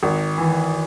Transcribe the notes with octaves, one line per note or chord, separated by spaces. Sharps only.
G#1
E3